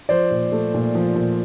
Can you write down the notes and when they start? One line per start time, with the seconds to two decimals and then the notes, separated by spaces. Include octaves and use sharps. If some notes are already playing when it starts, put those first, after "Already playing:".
0.09 F3 C5 D5
0.31 A#2
0.52 A3
0.74 A#2
0.95 F3
1.16 A#2